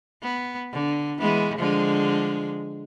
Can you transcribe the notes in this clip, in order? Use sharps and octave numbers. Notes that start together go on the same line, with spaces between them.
B3
D3
E3 G#3 B3
D3 F3 G#3